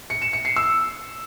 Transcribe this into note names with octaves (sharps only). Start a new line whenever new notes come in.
C#7
E7
C#7
C7
E6